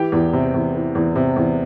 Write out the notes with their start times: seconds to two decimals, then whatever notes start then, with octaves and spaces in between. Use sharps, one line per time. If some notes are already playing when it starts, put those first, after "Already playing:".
Already playing: E3 G4 G5
0.12 E2
0.33 C3
0.54 E2
0.74 E3
0.95 E2
1.16 C3
1.36 E2